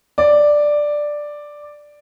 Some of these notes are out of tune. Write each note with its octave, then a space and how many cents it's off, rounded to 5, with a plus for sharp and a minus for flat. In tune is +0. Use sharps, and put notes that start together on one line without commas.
D5 +5